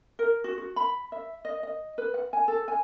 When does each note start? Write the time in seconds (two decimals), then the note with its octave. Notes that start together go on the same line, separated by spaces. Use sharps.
0.19 A#4
0.44 F#4
0.58 F#4
0.76 B5
1.12 E5
1.45 D#5
1.63 D#5
1.98 B4
2.14 F#5
2.33 G#5
2.48 A4
2.68 G#5